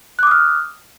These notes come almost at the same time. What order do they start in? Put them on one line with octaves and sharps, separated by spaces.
F#6 D6 D#6 F6